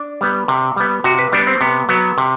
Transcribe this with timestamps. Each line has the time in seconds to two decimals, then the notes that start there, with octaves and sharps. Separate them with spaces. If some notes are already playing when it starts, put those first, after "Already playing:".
Already playing: D4
0.21 G3 B3
0.48 C3
0.76 G3 B3
1.04 C3 F#4
1.19 B4
1.32 G3 B3 D4
1.47 C4
1.61 C3 B3
1.89 F#3 B3
2.18 C3